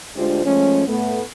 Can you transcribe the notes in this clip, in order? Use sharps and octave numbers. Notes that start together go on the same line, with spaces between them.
D2 G#3 D4 F4 G4 C5
F3 G#3 A3 C#4
A2 A3 B3